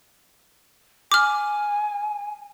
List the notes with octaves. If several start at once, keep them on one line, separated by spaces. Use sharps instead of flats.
G#5 D6 F6